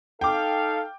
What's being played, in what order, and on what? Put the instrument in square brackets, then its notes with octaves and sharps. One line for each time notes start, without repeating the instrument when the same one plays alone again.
[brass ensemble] D#4 A4 F5 [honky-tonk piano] G5 D6